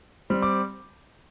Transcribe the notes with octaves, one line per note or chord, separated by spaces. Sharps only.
G3 C4
D6